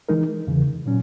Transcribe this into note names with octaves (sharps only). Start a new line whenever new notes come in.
E3 G#3 D#4 A#4
E2 C#3 E3
A#2 F#3 C#4